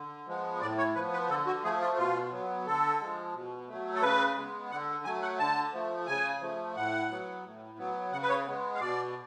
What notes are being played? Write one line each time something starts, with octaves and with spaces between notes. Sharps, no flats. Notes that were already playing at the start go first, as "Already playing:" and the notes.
Already playing: D3
F3 G#3 B3
A2 D5
C#5
F3 B3 B4
B4
D3 A4
F#4
F3 A3 G#4
F4
B2 F4
F#3 B3
D3 A4
F3 G#3
B2
F#3 A3
A4
C#3 B4
G#3 B3
D3 F#5
F#3 A3 G#5
F#5
D3 A5
F3 A3
C#3 G#5
F3 A3
A2 F#5
F#3 B3
A2
F#3 B3
C#3 F#5
B4
C#5
G#3 B3
F5
B2 D5